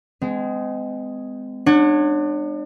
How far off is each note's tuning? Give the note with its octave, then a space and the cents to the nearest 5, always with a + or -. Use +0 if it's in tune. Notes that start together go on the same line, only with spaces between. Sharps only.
G#3 +0 C4 -40
D4 +35 C#5 -10 F#5 -20